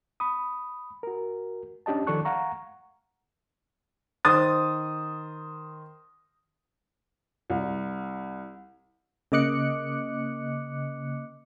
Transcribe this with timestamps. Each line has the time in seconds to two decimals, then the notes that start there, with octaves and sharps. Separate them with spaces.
0.20 B5 D#6
1.03 F#4 A#4
1.86 C#4 D4 G4 D#5 A5
2.07 D#3 F3 A4 D5 C#6 F#6
2.25 F5 F#5 A#5 C#6
4.25 D#3 C5 D#6 A6
7.50 C2
9.32 C#3 A#3 D#5 D6 F#6 C#7